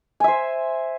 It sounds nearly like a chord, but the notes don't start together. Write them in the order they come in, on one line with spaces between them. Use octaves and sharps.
G#5 E5 C5